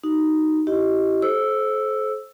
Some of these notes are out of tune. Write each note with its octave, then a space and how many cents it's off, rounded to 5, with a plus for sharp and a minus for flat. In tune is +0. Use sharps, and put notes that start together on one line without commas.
D#4 +0 F#4 +35
E4 +0 G4 -25 D#5 +0
A4 -35 C5 +15 E6 +0